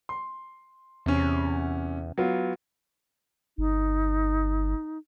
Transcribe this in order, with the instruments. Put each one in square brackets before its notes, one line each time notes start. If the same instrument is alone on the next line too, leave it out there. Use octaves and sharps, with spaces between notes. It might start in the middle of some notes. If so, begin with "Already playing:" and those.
[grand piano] C6
[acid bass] E2 [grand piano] C3 C#4
[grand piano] F#3 B3 F4
[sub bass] G1 [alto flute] D#4